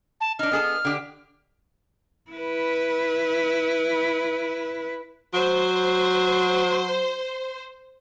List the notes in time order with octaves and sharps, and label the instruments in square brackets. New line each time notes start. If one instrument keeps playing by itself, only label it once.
[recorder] A5
[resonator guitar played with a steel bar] D4 D#4 [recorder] F6
[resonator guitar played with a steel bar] B3 G#4 A4
D3 G4
[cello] E4 B4
[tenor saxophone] F#3 [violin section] C5